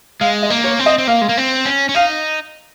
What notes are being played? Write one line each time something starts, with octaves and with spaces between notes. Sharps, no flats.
G#3 F5
D#5
A#3
C#5
C4
D#5
C4
A#3 F5
G#3
A#3
C4
C#4
C#4
D#4 F5